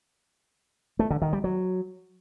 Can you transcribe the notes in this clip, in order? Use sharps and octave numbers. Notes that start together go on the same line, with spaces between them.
A3
D3
D#3
G3
F#3